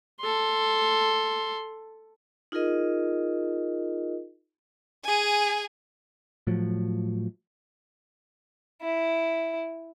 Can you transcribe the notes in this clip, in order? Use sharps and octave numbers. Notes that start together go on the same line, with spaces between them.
A4 C6
D#4 F4 G#4 A#4 D#5
G#4 G#5
A2 F3 F#3
E4